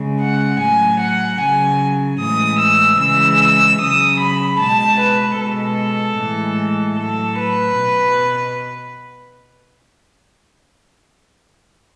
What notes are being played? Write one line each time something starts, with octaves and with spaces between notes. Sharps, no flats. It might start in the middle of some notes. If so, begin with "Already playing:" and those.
Already playing: C#3 G#3
F#5
A2 F#3 G#5
F#5
C#3 F#3 G#5
A2 E3 G#3 D#6
E6
C#3 E3 G#3 E6
E6
C#3 F#3 D#6
B5
B2 G#3 A5
B4
B2 G#3 A4
A2 E3 G#3
A2 F#3 A4
B4
B2